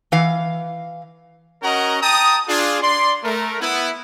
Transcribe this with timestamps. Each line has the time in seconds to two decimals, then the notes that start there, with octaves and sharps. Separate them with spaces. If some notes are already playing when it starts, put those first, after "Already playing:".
0.12 E3 F5
1.63 C#4 F#4 A#4 D#5 F#5 A#5
2.02 G5 A5 A#5 D#6
2.48 D4 F4 G#4
2.82 D5 C6
3.24 A3 A#4
3.60 B3 E4